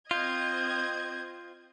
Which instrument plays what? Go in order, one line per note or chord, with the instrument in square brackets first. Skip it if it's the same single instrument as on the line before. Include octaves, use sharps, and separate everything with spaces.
[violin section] C4 D#5 G#6 [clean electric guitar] F4 [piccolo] G6